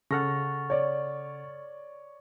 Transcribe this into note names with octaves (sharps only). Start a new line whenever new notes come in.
C#3 A4 F#5 C#6 F6 A6 A#6
C#5 D5